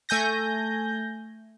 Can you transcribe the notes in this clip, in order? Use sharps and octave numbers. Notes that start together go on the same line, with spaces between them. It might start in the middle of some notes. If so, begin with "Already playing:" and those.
A3 G#5 G6 A#6